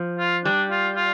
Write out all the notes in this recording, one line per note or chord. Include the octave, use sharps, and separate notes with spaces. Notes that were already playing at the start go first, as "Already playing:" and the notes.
Already playing: F3
F4
G3 D4
F4
F4